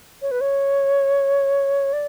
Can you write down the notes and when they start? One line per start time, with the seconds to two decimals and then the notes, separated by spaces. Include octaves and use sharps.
0.22 C#5
0.31 B4
0.41 C#5
1.93 D5